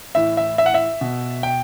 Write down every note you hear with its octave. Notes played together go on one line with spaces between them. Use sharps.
A2 E3 E5
E5
E5
F#5
E5
B2
G5